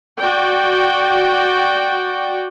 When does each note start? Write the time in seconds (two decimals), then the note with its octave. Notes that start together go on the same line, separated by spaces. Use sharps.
0.20 F#4 D5 G5